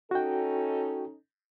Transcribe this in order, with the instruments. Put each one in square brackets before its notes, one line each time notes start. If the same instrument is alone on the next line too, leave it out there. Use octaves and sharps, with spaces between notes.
[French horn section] C#4 D#4 A4 [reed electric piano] F#4 G5